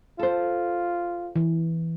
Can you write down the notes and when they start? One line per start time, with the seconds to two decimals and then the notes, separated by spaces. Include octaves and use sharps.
0.19 F4 A4 C5
1.36 E3